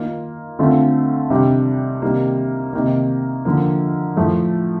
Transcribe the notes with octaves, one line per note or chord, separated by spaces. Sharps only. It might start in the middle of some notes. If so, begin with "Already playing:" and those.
Already playing: D#3 A#3 F4
D3 A3 C4 F4
C3 D#3 G3 D4
C3 D#3 G3 A#3
C3 D#3 A#3
D3 F3 A#3
A2 F3 A3